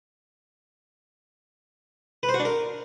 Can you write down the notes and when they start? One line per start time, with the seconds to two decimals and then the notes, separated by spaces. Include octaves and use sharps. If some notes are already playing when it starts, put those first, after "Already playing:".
2.23 B4
2.29 C5
2.34 F#4
2.40 D4
2.45 A#4